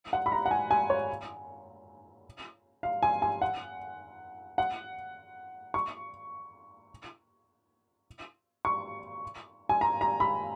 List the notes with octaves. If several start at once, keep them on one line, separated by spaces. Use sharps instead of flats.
F#5
B5
A#5
F#5
G#5
G#5
C#5
F5
G#5
G#5
F#5
F#5
C#6
C#6
G#5
A#5
A#5
B5